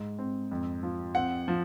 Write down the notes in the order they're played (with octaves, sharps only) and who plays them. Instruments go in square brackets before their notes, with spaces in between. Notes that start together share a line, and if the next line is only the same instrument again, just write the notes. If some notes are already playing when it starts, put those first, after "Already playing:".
Already playing: [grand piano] G#2
C4
F2
F3
C4 F#5
F3